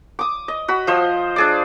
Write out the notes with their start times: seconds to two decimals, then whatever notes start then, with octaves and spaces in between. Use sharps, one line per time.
0.19 D6 D#6
0.48 D#5
0.68 F#4 B5
0.87 F3 C5 D#5
1.36 D4 G#4 D5